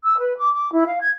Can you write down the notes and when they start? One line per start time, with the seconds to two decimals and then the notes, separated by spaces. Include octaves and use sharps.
0.04 E6
0.18 B4
0.38 D6
0.54 D6
0.73 E4
0.87 F5
1.01 G#6